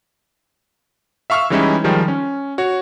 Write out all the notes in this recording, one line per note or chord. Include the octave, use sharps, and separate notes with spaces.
E5 F5 C#6 E6 F6
E3 G3 G#3 C#4 D#4 E4
D#3 F3 G3 G#3
C#4
F#4 C#5